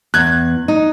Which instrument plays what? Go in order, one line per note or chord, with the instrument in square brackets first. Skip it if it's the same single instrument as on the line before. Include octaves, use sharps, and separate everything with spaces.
[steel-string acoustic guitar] E2 [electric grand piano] F#6 G#6
[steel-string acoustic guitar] D#4